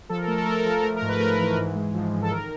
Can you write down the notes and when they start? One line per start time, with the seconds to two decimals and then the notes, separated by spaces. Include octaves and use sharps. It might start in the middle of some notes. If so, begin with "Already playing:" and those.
0.09 F3 A4
0.17 A#4
0.24 A4
0.28 A3 A#4
0.38 A4
0.46 A3 A#4
0.52 A4
0.59 A#4
0.66 F3 A4
0.83 A3 A#4
0.96 A#4
1.02 G#2
1.08 B4
1.20 A3 A#4
1.39 E3
1.57 G#2
1.76 G#3
1.94 F3
2.12 G#3
2.22 A4
2.30 D#3 A#4